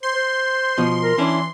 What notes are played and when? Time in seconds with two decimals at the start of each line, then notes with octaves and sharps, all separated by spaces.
0.03 C5 C6
0.15 C5
0.78 B2 F3
1.02 A#4
1.18 E3 C#4 D4 E4